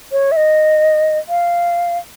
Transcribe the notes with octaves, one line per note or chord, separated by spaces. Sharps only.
C#5
E5
D#5
F5